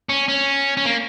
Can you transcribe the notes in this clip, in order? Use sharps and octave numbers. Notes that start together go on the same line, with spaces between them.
C#4
C#4
C#4
A#3